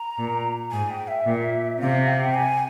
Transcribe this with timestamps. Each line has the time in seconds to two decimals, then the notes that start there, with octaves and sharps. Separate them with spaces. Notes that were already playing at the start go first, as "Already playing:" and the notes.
Already playing: A#5
0.18 A#2
0.71 G#2 G#5
0.90 G5
1.08 E5
1.26 A#2
1.79 C3 F5
2.07 G5
2.34 G#5